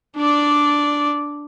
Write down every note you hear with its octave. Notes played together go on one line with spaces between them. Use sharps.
D4 D5